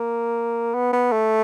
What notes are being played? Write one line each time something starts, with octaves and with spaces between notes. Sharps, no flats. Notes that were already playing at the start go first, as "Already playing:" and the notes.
Already playing: A#3
B3
B3
A3